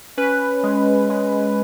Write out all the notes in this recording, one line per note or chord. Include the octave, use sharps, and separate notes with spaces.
C#4 B4
G#3
G#3